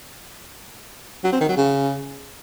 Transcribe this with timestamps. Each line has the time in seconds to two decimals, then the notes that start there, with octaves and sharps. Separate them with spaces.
1.24 F#3
1.32 C4
1.41 D#3
1.49 F#3
1.57 C#3